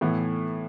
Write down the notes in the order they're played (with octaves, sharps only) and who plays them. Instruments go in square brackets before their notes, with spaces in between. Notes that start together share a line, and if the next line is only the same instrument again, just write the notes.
[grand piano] A2 E3 B3